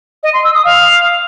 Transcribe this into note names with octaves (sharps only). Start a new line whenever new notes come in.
D#5
C6
E6
D#6
F5